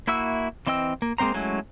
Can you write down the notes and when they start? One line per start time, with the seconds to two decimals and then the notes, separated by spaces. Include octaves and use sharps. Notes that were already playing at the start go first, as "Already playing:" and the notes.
0.07 A#3 E4 F#4 E5 E6
0.67 E3 C4 D#5 G5 E6
1.02 A#3
1.18 G#3 A#3 C4 C5 A#5
1.34 F#3 G#3 A3 C#4 E4